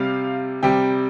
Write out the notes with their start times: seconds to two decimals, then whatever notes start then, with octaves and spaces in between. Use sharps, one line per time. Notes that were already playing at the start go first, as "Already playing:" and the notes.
Already playing: C3 G3 F5
0.63 C3 G3 G5